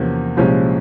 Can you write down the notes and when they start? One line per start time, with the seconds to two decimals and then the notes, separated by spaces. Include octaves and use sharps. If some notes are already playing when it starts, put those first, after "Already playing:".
Already playing: E2 C3 F3 A#3 C#4
0.37 C2 A#2 F3 G#3 C#4